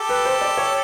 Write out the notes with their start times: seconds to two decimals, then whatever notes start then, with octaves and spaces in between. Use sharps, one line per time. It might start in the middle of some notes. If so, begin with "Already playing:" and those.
Already playing: G4 A4
0.09 B4
0.25 C5
0.41 D5
0.57 C#5